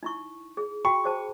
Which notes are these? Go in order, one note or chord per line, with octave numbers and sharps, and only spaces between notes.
D#4 E4 C#6
G#4
F#4 G5 B5 C#6
G#4 C5 A5